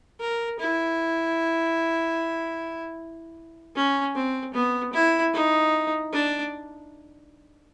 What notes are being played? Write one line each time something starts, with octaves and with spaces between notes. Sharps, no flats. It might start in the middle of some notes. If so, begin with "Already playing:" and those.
A#4
E4
C#4
C4
B3
E4
D#4
D4